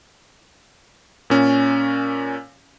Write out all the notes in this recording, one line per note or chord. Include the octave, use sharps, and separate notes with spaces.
A#2 C#4